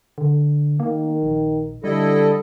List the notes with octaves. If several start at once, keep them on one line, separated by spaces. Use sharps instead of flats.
D3
D#3 A#3
A#1
D3 G3 E4 A4 D#5